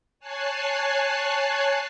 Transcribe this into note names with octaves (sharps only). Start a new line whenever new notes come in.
C#5 G#5 A5 F#6 C7